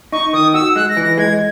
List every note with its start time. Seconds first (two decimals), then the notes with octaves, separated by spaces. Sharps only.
0.12 D#4 C#6
0.33 D#3 D#6
0.54 F#4 E6
0.76 G#3 F#6
0.89 A#6
0.97 E3
1.03 A#6
1.18 G#3 G#6